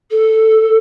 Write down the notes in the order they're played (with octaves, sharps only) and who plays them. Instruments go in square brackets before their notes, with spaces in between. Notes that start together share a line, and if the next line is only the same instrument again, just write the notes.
[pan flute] A4